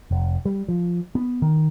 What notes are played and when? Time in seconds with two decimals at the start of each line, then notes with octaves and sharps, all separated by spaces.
0.11 F1
0.45 G3
0.68 F3
1.15 B3
1.42 D#3